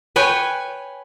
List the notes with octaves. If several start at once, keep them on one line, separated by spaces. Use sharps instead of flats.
B4 C#5 G5 G#5